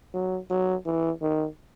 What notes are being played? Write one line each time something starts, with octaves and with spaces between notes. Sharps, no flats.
F#3
F#3
E3
D#3